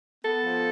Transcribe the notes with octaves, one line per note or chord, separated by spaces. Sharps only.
B3 A4
F3